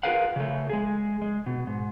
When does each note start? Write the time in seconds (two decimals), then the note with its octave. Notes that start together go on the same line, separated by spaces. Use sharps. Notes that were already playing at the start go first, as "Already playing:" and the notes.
0.03 F4 G#4 A#4 B4 F5 F#5
0.36 C#3 A3
0.69 G#3 G#4
1.22 G#3
1.46 B2
1.67 G#2